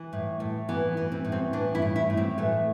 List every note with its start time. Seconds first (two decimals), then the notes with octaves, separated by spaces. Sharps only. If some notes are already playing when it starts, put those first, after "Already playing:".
Already playing: E3
0.13 A2
0.40 A2
0.69 E3 B3
0.97 E3
1.12 C4
1.25 A2
1.32 C4
1.53 E3 D4
1.75 E4
1.82 A2
1.96 E4
2.10 A2
2.17 C4
2.38 E3 A3